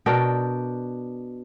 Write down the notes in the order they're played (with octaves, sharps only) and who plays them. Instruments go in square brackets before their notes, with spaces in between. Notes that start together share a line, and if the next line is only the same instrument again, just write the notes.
[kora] B2 D4 A#4 G5